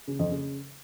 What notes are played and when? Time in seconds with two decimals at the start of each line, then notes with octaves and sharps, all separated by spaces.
0.08 C#3
0.19 F2
0.31 C#3